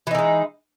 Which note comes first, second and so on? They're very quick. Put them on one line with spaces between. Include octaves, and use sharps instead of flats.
E3 D#4 D3 G#3